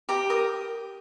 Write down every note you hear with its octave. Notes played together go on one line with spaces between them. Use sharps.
G4 A#5
A#4 D#6